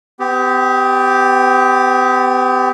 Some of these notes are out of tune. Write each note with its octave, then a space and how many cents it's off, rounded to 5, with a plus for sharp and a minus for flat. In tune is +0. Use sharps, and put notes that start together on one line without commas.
B3 +40 G4 +5